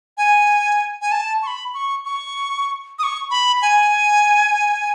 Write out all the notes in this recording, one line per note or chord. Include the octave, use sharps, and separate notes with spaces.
G#5
G#5
A5
C#6
B5
C#6
C#6
D#6
C#6
B5
G#5